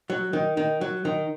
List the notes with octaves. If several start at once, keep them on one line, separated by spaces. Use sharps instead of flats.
F#3
D#3
D#3
F#3
D#3